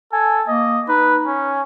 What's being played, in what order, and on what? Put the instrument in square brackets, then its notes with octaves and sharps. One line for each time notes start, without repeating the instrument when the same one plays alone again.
[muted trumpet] A4 [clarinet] G#5
[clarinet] A#3 [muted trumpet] D#5
[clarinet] D#4 [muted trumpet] B4
[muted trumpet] C#4